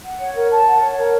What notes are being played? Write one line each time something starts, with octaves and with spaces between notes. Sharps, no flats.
F#5
C#5
A#4
A5
F#5
C#5
A#4